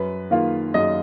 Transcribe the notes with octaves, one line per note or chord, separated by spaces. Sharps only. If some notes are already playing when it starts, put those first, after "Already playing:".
Already playing: F#2 B4
D#3 A#3 F4
F#2 D#5